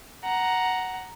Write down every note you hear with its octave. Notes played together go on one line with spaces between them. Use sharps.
F#5 A#5